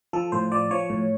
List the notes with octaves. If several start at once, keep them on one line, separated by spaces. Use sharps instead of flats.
F3 A4
A2 C5
F3 D5
F3 C#5
A2